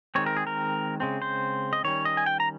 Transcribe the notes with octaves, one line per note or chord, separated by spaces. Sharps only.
D#3 G#3 C4 C#5
A#4
G#4
A#4
C#3 G#3 C4
C5
D#5
D#3 G3 C#4 C#5
D#5
G#5
G5
A#5